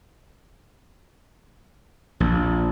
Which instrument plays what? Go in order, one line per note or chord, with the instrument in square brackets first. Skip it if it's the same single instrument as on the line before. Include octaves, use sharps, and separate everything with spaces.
[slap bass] A#1